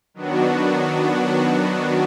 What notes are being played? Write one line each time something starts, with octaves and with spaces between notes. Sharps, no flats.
D#3 F#3 B3 D4 F#4